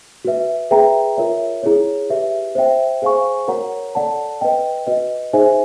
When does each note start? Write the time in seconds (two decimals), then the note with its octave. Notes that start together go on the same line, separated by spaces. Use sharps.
0.25 F#4 B4 E5
0.71 G#4 B4 E5 G5 A#5
1.17 F4 A#4 C#5 E5
1.63 E4 G#4 C#5
2.10 G4 B4 E5
2.55 C5 E5 G5
3.02 G#4 C5 F5 G#5 C#6
3.48 F#4 A#4 C#5 F#5 A#5
3.95 A4 D5 F#5 A5
4.41 B4 D#5 G5
4.87 F#4 B4 D#5
5.33 D#4 G#4 C5 E5 G#5